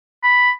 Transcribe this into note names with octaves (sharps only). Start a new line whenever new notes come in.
B5